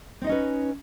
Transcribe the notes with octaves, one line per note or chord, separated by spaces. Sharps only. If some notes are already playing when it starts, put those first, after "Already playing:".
C4 C#4 D#4 B4 D#5